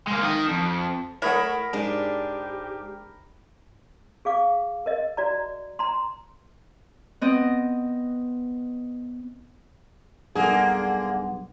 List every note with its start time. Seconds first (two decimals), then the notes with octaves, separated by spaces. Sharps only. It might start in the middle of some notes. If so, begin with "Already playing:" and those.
0.07 G#3 A#3
0.22 D#3 D#5
0.48 F2
1.22 A3 E4 A#4 C#5 F#5 B5 D#6
1.73 G#2 D4 G4
4.25 G#4 F5 D6
4.86 A#4 D#5
5.17 F#4 D5 A#5
5.79 A#5 C6
7.21 B3 C4 D#5
10.35 B1 G2 D3 A#3 G#4 F#5